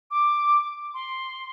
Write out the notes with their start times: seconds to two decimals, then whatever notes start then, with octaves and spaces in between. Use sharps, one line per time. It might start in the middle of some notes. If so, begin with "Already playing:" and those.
0.11 D6
0.94 C6